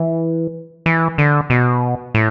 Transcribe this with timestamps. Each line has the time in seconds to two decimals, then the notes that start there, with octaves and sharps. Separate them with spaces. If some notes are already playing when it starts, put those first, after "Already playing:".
Already playing: E3
0.86 E3
1.18 D3
1.50 B2
2.14 A2